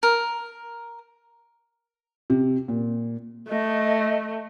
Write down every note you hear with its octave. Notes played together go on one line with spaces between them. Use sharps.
A#4
C3
A#2
A3 D#5